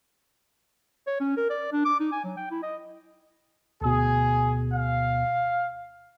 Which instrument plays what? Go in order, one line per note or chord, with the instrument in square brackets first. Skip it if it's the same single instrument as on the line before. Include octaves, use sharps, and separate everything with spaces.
[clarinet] C#5
C#4
A#4
D5
D4
D6
D#4
G#5
F#3
G5
E4
D#5
[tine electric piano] D2 B2 [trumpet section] G#4
[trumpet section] F5